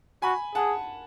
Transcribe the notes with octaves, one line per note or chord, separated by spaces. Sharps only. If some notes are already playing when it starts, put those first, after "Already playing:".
F#4 G#5 B5
G#4 F#5 A5